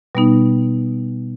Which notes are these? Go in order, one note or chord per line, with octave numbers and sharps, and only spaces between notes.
B2 G3 B3 D#4